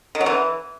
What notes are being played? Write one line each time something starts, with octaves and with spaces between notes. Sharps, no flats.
D#3
F#3
E3